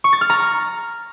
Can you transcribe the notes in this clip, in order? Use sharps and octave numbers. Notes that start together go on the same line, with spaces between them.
C#6
A6
F6
A#5